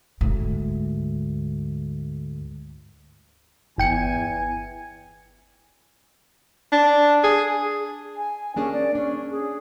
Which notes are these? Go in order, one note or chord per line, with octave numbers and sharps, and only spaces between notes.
D2 G#2
G1 E2 G5 G#5 C#7
D4
G#4
G#5
A#3 C#4 D4 G#4
D5
C#4 D4
G#4